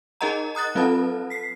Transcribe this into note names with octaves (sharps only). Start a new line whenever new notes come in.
D#4 G#4 A#4 D#5 F#5 A#5
A#5 D#6 F#6 A6
F#3 C4 F4 A4 B4 A5
B6 C7